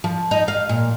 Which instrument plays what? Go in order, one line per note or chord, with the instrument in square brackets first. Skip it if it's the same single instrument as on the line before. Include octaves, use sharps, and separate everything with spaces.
[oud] F3
D#4
F5
A#2